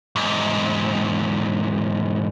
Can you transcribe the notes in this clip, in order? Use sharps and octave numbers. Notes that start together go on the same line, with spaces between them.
E2 G#2